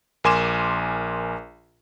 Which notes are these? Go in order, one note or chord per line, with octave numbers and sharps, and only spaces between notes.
A#1 A#4 G#5 C6 D6 E7